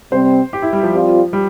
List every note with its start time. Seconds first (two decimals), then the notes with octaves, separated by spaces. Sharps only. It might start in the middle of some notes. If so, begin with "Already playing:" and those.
0.12 C3 G3 C4 C5
0.53 G4
0.62 E4
0.73 G3
0.83 F3
0.93 G3 C4 F4
1.33 G3